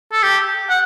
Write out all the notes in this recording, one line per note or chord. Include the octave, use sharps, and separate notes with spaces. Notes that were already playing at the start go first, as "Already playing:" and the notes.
A4
G4
F#5